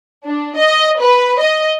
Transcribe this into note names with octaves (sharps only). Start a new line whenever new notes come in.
D4
D#5
B4
D#5